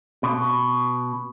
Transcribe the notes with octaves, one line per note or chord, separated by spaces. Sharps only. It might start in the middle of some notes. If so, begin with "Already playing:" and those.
B2